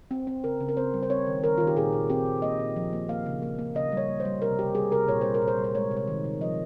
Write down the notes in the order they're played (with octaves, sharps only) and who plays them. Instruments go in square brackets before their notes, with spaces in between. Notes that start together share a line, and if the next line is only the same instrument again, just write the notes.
[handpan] C4
C4
C#3 A#4
C#3
A#4
C4 C5
G3
C5
C4 C#5
D#3
D#3 A#4
D#3 F4
G4
A#2 G#4
A#2
C4 G4
A#2
A#3 D#5
A#2
F3
A#3
A#3 F5
C#3
A#3
A#3
C#3 D#5
G3
C#5
A#3
C5
G3
C3 A#4
C3 G4
G3 G#4
C3 A#4
A#2 C#5
G3 C5
A#4
A#2
C5
G3
C5
G#3 C#5
C3
C#5
D#3
C3
F3 D#5